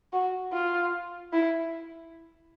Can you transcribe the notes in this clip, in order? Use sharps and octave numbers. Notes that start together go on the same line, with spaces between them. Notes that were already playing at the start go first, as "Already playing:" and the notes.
F#4
F4
E4